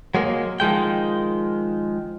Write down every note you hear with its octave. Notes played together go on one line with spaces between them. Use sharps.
F#3 G#3 A#3
D#3 F3 G#3 G5